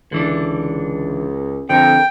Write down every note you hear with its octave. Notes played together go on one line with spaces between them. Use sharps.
C#2 D3 E3 D4
F2 D3 A#4 G5